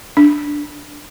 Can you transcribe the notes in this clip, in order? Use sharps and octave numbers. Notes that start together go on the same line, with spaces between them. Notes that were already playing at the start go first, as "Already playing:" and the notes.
D4